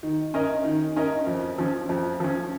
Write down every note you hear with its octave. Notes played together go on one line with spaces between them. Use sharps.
D#3
C#4 A#4 D#5
D#3
C#4 A#4 D#5
F2
F3 C#4
F2
F3 C#4